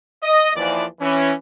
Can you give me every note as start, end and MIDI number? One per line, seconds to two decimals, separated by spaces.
0.23 0.52 75
0.56 0.84 39
0.56 0.84 52
0.56 0.84 53
0.56 0.84 74
1.00 1.32 52
1.00 1.32 61
1.00 1.32 64